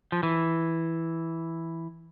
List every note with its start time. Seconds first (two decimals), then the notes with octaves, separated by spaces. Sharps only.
0.12 F3
0.23 E3